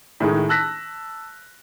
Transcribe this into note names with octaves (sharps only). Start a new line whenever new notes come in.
A2 D#3 G#3
A5 E6 F#6 A#6 B6